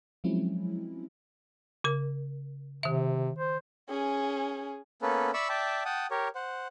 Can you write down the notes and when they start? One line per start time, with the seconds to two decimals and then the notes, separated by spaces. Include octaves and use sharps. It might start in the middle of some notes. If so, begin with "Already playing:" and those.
0.24 F3 F#3 G#3 C4 C#4 E4
1.84 C#3 A#4
2.83 C3 D#3 E5
3.38 C5
3.89 C#4 G#4
5.02 A#3 B3 C#4 A4 B4
5.34 D5 E5 B5 C#6 E6
5.49 D5 E5 G5 A5
5.85 F#5 G5 A5 D#6
6.11 G4 A#4 C#5
6.35 C5 F#5